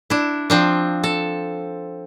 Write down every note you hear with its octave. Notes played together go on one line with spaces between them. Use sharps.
D4 E4
F3 C4 D4
A4